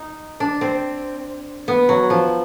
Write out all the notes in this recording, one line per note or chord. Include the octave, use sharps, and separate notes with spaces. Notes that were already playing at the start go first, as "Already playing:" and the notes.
Already playing: D#4
D4
C4
B3
F#3
F3